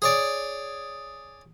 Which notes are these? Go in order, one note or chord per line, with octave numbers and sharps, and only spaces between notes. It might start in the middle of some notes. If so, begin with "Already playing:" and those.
G#4 C#5 D5